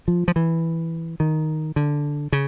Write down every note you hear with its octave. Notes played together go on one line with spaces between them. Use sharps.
F3
F3
E3
D#3
D3
C#3